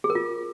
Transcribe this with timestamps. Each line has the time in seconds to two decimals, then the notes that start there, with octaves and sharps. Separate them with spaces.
0.04 G#4
0.10 A#4
0.15 F4